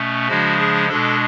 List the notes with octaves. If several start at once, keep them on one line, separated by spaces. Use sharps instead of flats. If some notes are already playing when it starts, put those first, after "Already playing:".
Already playing: B2 A3 C#4
C#3 F3 G#3 D4 F#4
G#4
B2 G#3 D4 A4